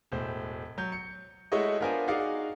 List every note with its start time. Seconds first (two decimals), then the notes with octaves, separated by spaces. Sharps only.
0.12 E1 A2 C5
0.78 F#3 G6
0.92 C#7
1.52 G#3 A3 E4 F#4 C#5 D#5
1.80 B3 D4 F4 A#4 C5 G#5
2.08 D#4 F#4 G#4 D5 F5 D6